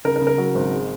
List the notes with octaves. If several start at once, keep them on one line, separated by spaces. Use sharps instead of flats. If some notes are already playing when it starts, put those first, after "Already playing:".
C#3 A#4
A#4
C#3
A#4
F#3
G#1
G#3